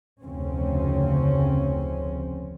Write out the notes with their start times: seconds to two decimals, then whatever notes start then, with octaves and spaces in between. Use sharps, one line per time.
0.21 F1 D2 C#3 C4 C#4